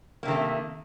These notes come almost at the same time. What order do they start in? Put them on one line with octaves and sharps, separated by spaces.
A#3 C3 D#3 A3